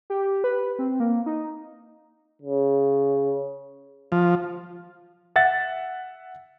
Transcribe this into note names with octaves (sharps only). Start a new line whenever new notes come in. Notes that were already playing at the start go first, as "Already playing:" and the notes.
G4
B4
C4
A#3
D#4
C#3
F3
E5 F#5 A6